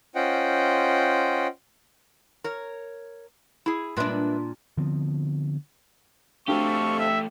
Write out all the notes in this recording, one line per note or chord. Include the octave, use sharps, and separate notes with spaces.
C#4 F4 C5 D#5 F#5 G5
A#4 C#5
E4 G#4
A#2 G#3 D4 B4 E5
D3 F3 B3 C4
A3 C4 D4 F#4 G4 A4 F5 C#6
E5